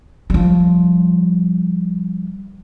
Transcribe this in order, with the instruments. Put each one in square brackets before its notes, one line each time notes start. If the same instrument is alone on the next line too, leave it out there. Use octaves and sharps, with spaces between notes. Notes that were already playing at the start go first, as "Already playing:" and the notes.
[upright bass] F3 G3